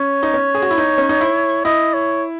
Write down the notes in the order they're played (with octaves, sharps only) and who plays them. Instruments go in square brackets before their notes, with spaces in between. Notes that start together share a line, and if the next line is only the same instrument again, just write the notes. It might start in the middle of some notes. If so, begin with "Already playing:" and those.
Already playing: [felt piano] C#4 [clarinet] C#5
[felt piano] D#4
C#4
G#4
F#4
E4
D#4
C#4
D#4
E4
[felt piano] E4 [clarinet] D#5
[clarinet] C#5